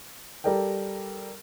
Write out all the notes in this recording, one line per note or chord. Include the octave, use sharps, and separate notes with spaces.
G3 A4 A#4 D5 G5